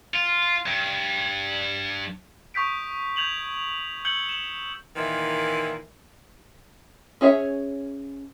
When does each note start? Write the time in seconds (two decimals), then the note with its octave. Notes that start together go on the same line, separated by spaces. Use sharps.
0.14 F4
0.66 G2
2.54 C#6 D#6 G6 B6 D7
3.16 G6 G#6 F7 F#7
4.05 E6 G6 G#6 C#7 F#7 G7
4.29 E7 F#7
4.96 A#2 D#3 E3
7.21 C#4 G#4 C#5 E5